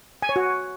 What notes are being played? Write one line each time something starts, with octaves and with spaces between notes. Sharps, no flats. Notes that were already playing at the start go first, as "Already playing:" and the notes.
G#5
C#5
F#4